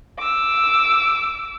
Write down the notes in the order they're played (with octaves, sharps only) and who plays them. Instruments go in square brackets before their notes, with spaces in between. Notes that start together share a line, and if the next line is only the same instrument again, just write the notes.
[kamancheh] D6 E6